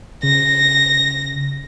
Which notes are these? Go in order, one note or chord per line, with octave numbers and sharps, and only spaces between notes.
C#3 A#6